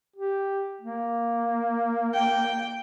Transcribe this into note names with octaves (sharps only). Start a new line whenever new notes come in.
G4
A#3
G5